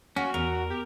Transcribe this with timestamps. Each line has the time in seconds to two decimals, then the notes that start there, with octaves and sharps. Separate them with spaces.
0.16 A#3 C#4 F#4
0.34 E2 A#4
0.70 G4